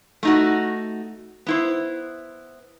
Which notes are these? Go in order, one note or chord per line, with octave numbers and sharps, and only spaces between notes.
A3 D#4 F#4
B3 E4 C5